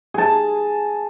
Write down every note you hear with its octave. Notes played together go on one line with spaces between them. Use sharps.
G#4 A5